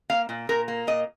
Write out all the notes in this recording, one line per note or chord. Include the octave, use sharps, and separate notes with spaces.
A#3 F5
A#2
A#2 A#4
A#3
A#2 D#5